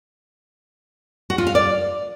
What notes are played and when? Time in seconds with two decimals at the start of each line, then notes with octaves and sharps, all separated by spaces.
1.30 F#4
1.38 F4
1.47 F5
1.55 D5